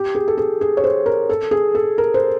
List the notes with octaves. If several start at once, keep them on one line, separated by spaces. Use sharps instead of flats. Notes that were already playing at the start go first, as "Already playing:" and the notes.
Already playing: G4
G#4
A4
G#4
G#4
C#5
C5
A#4
A4
G#4
A4
A#4
C5